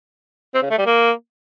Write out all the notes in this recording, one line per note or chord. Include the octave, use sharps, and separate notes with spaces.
C4
C#3
A3
G3
A#3